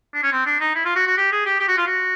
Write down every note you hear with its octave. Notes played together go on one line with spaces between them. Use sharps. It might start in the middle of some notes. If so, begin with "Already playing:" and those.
D4
C#4
C4
D4
D#4
E4
F4
F#4
F#4
G4
G#4
G4
G4
F#4
F4
F#4